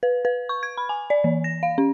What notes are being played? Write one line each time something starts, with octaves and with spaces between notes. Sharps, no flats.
B4
B4
C#6
G#6
B5
G#5
D5
E3
A#6
F5
C#4